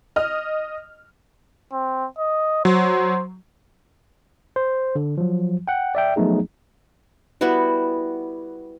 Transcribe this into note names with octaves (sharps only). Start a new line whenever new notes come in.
D#5 F6
C4
D#5
F#3 C5
C5
D3
F3 F#3
F#5 G5
D5 E5 G5
F3 F#3 A3 B3 D#4 G#4
G3 B3 E4 F#4